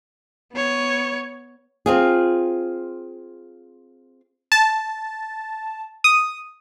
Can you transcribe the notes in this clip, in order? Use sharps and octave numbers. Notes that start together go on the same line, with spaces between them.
B3 C#5
C4 F4 G#4
A5
D#6